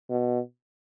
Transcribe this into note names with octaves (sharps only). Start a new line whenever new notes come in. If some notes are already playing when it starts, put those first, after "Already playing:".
B2